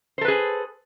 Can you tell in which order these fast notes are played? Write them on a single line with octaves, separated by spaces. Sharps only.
C5 A4 B4 G#4